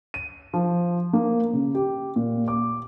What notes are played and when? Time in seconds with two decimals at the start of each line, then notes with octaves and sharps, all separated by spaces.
0.14 D#7
0.54 F3
1.13 A#3
1.53 C#3
1.75 G4
2.16 A#2
2.48 D6